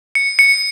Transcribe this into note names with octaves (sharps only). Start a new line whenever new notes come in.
C#7
C#7